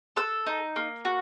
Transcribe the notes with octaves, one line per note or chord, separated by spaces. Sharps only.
A4 E6
D#4
A#3
F#4